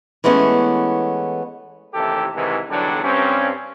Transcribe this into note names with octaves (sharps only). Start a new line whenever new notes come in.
E3 G#3 A3 B3 C#4
A1 D#2 C3 E3 G4 A4
G#2 C3 D#3 E3
B1 E2 D3 F#3 G3 D4
G2 C4 C#4